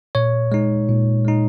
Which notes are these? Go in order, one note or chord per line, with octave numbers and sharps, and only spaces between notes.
A#2 C#5
G#3 D#4
A#2
G#3 D#4